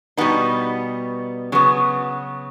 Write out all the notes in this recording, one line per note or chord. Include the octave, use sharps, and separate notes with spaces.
B2 G3 B3 D#4
C#3 F#3 B3